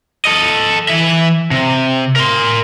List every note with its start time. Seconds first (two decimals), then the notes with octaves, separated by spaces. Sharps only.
0.25 A4 D#5
0.88 E3 E5
1.51 C3
2.16 A#4 C6